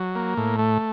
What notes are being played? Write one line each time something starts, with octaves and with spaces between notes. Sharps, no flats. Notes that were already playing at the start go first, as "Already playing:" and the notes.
Already playing: F#3
A#3
A2
A3